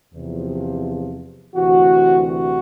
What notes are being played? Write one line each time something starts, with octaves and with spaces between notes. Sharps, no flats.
E2 C3 F3
D2 C3 E3 F#4
F#4